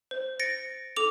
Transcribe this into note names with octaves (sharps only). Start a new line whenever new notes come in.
C5
A6 A#6 C#7 D7
A4 D6 F7